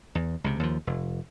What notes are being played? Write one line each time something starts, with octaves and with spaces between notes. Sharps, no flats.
E2
C#2 C3
D#2 F3
F1